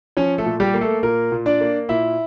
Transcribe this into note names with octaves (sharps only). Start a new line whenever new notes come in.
F3 C#4 C#5
A3 A4
A#2
G3 G4
A#3
A3 A4
A#2 A#3 A#4
A#2
D4 D5
A#3
A#2 E4 E5